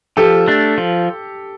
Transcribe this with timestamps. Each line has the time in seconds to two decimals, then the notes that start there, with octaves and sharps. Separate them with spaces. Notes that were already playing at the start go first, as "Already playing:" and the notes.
0.17 F3 G4 A4
0.48 A3 D4
0.78 F3